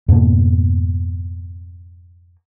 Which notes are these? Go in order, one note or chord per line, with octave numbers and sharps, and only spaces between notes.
F2 G#2 B2 A#3